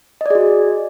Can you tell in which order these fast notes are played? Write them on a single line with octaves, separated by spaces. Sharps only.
D#5 D5 G#4 F#4